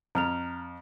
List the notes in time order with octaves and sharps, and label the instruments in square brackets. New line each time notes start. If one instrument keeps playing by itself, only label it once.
[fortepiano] F2 [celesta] A#5 F6 F7